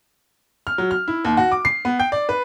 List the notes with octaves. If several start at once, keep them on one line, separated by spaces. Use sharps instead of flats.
F6
F#3
F6
E4
D#2
F#4
D6
C7
B3
G5
D5
B4